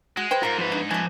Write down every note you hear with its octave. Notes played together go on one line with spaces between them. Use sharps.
G#3 F#4
B4 C5 G5
G#2 F4 A#4 C5
F2 B4
D4
F3 C#4 G#5 A5